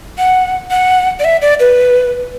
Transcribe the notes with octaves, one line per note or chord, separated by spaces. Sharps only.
F#5
F#5
D5
E5
D5
B4